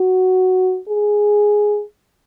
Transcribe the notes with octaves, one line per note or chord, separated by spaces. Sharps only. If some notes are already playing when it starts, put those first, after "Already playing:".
Already playing: F#4
G#4